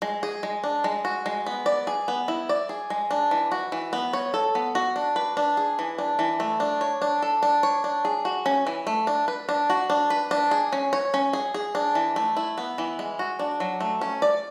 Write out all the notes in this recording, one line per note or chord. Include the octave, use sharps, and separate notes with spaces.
G#3
G#4
G#3
D4
G#3
F#4
G#3
B3
D5
G#4
B3
E4
D5
G#4
G#3
D4
E3
F#4
E3
B3
C#5
A4
B3
F#4
D4
B4
D4
G#4
E3
D4
E3
A3
D4
C#5
D4
A4
D4
C#5
D4
G#4
F#4
C#4
E3
A3
D4
B4
D4
F#4
D4
B4
D4
G#4
C#4
C#5
C#4
G#4
G#4
D4
E3
A3
E4
B3
E3
G#3
F#4
D4
F#3
A3
C#4
D5